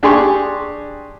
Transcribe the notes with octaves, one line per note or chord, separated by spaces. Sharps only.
D4 G4 G#4 G#5 C6 C#6